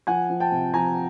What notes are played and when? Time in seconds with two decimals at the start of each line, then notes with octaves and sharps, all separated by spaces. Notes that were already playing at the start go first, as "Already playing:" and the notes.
0.07 F3 F#5 G#5
0.29 F3
0.40 G5 A5
0.52 C3
0.74 F3 G#5 A#5